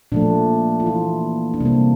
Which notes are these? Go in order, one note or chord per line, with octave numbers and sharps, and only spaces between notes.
A#2 F3 A3 D4
F4
E3 A#3 E4
D4
C3 G3 A#3 C4